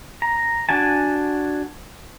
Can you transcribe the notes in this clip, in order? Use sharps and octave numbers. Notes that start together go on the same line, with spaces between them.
A#5
D4 F#4 G#5 A5